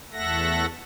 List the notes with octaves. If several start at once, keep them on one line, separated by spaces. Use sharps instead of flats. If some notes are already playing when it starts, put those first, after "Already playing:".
E2 A3 A4 E5 F#5 A#6